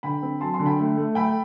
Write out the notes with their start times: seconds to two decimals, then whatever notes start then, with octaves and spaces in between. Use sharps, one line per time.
0.03 D3 G5 B5
0.23 C4
0.41 F#3 A5 C6
0.54 A5 C6
0.59 D3
0.66 G5 B5
0.79 A3
0.97 A3
1.15 A3 G5 B5